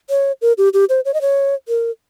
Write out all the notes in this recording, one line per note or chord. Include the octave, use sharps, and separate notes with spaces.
C#5
A#4
G4
G4
C5
C#5
D#5
C#5
A#4